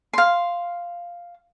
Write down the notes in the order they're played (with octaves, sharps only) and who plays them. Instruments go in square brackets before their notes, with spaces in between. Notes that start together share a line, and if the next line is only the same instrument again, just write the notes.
[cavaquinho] F5 C6